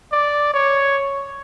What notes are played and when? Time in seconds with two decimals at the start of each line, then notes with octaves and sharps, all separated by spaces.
0.12 D5
0.54 C#5